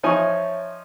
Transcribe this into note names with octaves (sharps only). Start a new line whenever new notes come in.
F3 D#4 C#5 E5 G#5 C#6